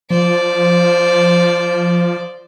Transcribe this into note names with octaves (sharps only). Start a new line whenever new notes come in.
F3 C5 D5